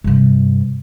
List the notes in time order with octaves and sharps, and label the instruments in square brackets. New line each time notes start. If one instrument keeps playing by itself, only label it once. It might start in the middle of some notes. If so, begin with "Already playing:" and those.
[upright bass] G2 C3